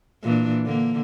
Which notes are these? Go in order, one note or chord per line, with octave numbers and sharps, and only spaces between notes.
A#2 E3 D4
D3 A#3